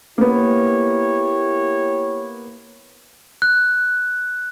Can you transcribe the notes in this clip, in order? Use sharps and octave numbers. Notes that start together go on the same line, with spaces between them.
A#3 B3 E4 G4 C#5
F#6